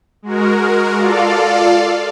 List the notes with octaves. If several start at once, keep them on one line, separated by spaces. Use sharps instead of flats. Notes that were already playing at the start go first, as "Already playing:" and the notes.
G#3 F#4 A#4
F4 A4 D5 F5